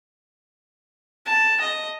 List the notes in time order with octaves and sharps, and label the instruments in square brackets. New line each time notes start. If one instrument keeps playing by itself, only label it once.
[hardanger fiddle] A5
D#5